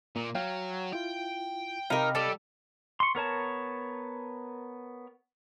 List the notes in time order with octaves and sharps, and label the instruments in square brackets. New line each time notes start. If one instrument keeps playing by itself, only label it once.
[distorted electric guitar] A#2 [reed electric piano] A#3
[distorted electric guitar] F#3 [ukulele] F5 [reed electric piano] G5
[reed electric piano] E4 F4 [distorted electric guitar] G5
[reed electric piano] C3 B5 [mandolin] D#4 A#4 [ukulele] G4 D#5 F5
[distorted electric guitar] G3 [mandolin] A4 D5
[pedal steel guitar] C6 C#6
B3 A#4 C#5 A5